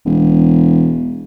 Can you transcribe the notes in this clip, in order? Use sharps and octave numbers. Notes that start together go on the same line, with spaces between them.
E1